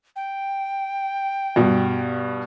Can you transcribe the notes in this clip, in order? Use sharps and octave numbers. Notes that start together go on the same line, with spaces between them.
G5
G2 B2